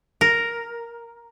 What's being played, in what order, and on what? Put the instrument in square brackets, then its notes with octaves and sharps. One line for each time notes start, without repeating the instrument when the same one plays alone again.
[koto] A#4